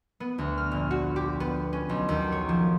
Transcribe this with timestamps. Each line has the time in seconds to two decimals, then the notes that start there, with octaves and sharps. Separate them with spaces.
0.20 B3
0.38 D2
0.57 F6
0.72 A#1
0.91 F#4
1.16 G4
1.40 B3
1.73 C#4
1.89 B1
2.09 D#2
2.32 C#5
2.49 F3